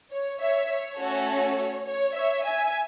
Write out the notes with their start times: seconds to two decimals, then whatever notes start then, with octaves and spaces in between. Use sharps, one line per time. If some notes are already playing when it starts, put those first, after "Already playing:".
0.12 C#5
0.40 C#5 E5
0.70 C#5
0.99 A3 C#4 F#4 A4
1.86 C#5
2.15 C#5 E5
2.44 E5 G#5